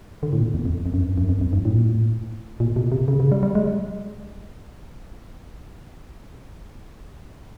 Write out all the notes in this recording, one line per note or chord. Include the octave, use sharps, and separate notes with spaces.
D3
A2
A#2
E2
F2
E2
F2
F#2
F2
F#2
F2
F2
G2
A2
A#2
A2
A#2
B2
C3
C#3
C#3
G3
G3
G#3